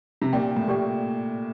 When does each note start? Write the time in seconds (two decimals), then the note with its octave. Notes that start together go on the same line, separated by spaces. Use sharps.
0.22 C3
0.33 A#2 G4 D5 G5
0.56 A2
0.68 A#2 G4 D5 G5